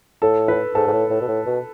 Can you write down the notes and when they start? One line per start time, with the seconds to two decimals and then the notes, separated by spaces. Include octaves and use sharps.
0.22 A2 A4
0.48 B4
0.75 G#2 A4
0.87 G#2
0.92 A2
1.10 A2
1.21 B2
1.28 A2
1.46 B2